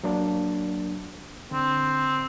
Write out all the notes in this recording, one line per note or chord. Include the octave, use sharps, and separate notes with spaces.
F#3 A#3 D4
D3 C4